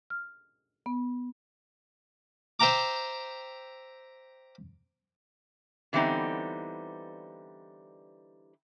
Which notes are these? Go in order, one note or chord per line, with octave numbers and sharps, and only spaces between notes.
F6
B3
C5 E5 G5 A#5 D6
D3 E3 G3 B3 C4 D#4